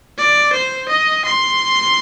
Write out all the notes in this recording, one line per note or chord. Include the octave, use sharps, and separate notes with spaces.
D5
C5
D#5
C6